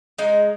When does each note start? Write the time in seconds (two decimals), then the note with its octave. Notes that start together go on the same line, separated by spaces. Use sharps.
0.18 G#3 D#4